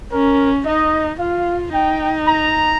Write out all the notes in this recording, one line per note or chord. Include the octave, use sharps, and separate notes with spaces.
C#4 A#4
D#4 D#5
F4 F5
D#4 G5
A#5